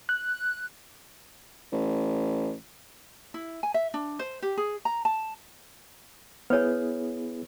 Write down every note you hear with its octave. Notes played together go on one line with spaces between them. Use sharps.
F#6
A1
E4
G#5
E5
D4
C5
G4
G#4
A#5
A5
B3 E4 G#4 B4 C#5